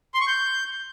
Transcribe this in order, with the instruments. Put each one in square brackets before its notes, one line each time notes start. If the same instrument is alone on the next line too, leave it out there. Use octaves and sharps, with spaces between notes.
[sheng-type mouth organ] C6
C#6
G6